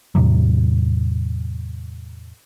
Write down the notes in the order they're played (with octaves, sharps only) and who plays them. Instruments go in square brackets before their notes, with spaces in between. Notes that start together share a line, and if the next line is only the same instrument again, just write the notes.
[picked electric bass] E2 A2 C3 F#3